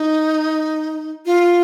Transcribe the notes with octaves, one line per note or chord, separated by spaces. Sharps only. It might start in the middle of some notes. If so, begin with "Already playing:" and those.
Already playing: D#4
F4